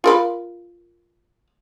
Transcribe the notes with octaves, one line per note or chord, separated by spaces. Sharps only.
F4 A#4 B4